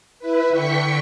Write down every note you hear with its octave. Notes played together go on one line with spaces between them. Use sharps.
E4 B4
D3 G5 C#6 B6 C#7